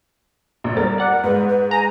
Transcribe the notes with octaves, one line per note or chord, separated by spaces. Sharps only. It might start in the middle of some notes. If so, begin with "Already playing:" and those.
A#1
G3 A#4 A6
D5 F#5
G#2 B4
B4
G#5 A#5